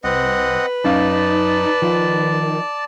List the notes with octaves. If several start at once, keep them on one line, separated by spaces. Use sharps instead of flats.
C2 C4 B4 D#5 F#5
F#2 C#4 D#4 D5 F5 A5
D#3 F3 F4